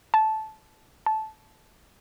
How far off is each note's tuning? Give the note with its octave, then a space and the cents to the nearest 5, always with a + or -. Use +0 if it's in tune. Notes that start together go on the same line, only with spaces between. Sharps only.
A5 -15
A5 -15